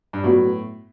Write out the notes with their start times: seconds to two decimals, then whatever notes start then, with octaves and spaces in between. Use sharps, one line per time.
0.13 G2
0.23 A2 F#3 B3 F#4